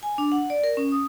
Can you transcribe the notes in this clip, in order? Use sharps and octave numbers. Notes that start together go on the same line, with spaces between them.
G#5
D4
F#5
D5
A#4
C#4
D#6